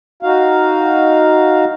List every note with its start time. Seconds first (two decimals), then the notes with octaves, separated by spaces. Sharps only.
0.23 D#4 F#4 F5